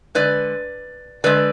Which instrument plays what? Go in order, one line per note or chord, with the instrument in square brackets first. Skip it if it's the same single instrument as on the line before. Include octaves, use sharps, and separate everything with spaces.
[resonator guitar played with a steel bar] D3 G#3 B4 D5
D3 G#3 B4 D5